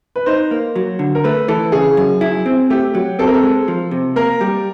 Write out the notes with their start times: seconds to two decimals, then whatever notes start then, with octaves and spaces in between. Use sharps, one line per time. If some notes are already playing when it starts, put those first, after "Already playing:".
0.16 B4
0.26 D#4 C5
0.51 A#3
0.76 F#3
0.99 D3
1.15 A#4
1.24 A3 B4
1.48 E3 A4
1.72 C#3 G#4
1.97 F#2
2.21 E4
2.46 C4
2.70 A3 G4
2.95 F#3
3.19 C4 A4
3.27 A#4
3.34 A4
3.43 G#3
3.68 F3
3.91 C3
4.16 A#3 A#4
4.41 G3